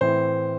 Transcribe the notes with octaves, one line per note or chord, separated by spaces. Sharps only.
A2 E3 C4 C5